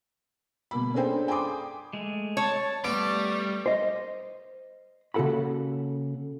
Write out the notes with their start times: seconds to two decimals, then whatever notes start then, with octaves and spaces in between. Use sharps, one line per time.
0.71 B2 A#3 B5
0.94 C#4 D4 G#4 A4 C5 G5
1.28 G5 G#5 B5 C6 D6 D#6
1.93 G#3 A3
2.37 C#5 A5
2.84 G3 A3 B3 D5
3.66 C5 D#5
5.14 C#3 A#3 F#4 A4 F#5 B5